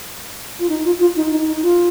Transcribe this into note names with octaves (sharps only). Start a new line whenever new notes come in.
F4
D#4
F4
F4
D#4
D#4
D#4
F4